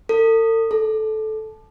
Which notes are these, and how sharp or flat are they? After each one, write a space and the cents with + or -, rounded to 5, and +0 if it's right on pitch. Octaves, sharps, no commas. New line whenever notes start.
A4 +45
A4 -15